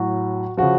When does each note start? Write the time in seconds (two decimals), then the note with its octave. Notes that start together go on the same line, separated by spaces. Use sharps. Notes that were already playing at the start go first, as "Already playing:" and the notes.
Already playing: A2 F#3 F#4
0.57 C#3 F3 F#4